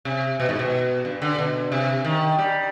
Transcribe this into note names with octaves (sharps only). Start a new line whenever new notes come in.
C3
B2
G#2
B2
G2
D3
B2
C3
D#3
G3